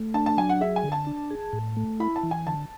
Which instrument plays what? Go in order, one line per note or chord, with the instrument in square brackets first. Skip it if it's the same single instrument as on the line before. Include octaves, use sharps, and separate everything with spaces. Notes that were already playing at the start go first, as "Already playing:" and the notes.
Already playing: [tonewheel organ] A3
[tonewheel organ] D4 [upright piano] A5
[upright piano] A5
[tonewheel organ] F#3 [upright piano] G#5
[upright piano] F#5
[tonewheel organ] G#4 [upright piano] E5
[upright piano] G#5
[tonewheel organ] D3
[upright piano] A5
[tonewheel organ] D4
G#4
A2
A3
[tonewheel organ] E4 [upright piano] B5
[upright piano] A5
[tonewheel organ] E3
[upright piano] G#5
[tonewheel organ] D3 [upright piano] A5